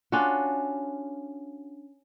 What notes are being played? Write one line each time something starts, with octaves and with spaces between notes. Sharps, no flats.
C#4 D4 F4 F#4